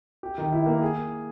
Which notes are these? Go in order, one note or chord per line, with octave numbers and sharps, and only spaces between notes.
G4
D#3
E4
A#3
G#4